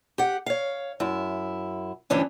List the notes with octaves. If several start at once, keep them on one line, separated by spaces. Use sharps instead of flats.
G4 F#5
C#5 F5
F#2 E4
D2 G2 E3 C#4 D4